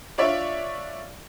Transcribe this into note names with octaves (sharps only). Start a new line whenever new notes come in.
D4 F4 C#5 D5 E5